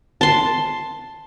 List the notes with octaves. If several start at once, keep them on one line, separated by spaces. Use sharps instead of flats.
A5 C6